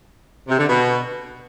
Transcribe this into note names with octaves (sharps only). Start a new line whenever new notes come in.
C3
D3
B2